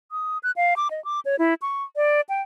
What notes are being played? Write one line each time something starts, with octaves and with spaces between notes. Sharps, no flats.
D#6
F#6
F5
D6
D#5
D6
C#5
E4
C#6
D5
G5